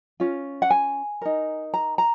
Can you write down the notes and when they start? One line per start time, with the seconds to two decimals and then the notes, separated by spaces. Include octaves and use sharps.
0.20 C#4 F4
0.62 F#5
0.70 G#5
1.22 D#4 A#4
1.74 A#5
1.98 A#5